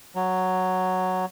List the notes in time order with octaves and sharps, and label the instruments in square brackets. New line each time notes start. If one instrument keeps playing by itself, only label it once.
[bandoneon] F#3